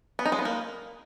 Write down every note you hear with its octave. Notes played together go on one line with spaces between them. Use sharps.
B3
D#4
G#3
B3
A#3